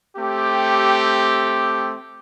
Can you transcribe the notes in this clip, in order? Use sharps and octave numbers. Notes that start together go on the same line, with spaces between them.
A3 C4 G4